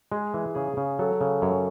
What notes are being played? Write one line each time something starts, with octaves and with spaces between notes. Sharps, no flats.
G#3 G#4
E3
C#3 G#4
C#3
F#3 A4
C#3
F#2 C#5